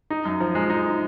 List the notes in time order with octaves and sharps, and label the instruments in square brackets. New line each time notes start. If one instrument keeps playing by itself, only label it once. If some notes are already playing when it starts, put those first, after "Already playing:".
[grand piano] D#4
F#2
F3
G#3
D#4